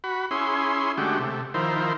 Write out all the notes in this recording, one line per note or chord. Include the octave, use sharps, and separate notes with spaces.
F#4 B5
C#4 E4 G#4 C6
D3 G#3 A3 F#4 G4
C3 A3
D#3 F3 E4 A#4 C5